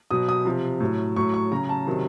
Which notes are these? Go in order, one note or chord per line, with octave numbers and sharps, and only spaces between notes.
B2 F#3 D#6
D#6
C3 F3
A2 F#3
A2 F#3 C#6
C#6
C#3 F#3 A#5
A5
C3 D#3 F#3